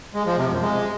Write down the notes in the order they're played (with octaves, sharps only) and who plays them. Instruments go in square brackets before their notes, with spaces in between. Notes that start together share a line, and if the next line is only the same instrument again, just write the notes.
[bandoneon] G#3
F3
C3
F#2
G#3